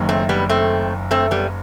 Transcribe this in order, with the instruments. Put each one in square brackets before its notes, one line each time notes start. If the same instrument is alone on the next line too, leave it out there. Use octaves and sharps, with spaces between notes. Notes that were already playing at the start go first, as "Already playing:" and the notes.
Already playing: [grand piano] F#1 F#2 D#3
[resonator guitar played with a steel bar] A3 C4
G3 B3
A3 C4
A3 C4
G3 B3